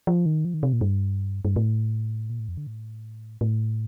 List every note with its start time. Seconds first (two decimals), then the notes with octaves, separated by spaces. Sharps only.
0.07 F3
0.26 D#3
0.45 F3
0.54 D#3
0.63 C3
0.73 A#2
0.81 G2
1.45 G2
1.56 A2
2.30 A#2
2.40 A2
2.49 F2
2.57 D3
2.67 A2
3.41 A2